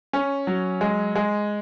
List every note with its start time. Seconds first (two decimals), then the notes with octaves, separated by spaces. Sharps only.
0.13 C#4
0.47 F#3
0.81 G#3
1.15 G#3